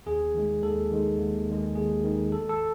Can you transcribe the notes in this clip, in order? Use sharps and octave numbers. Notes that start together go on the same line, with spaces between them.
D#2 G#4
D#3 G#3
D#2 A4
D#3 G#3
D#2
D#3 G#3
D#2 G#4
D#3 G#3
G#1 A4
A4